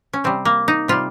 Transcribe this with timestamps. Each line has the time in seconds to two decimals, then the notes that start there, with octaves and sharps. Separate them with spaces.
0.13 C#4
0.24 C3 G3 C4
0.45 A#3
0.68 D#4
0.88 C3 G3 F4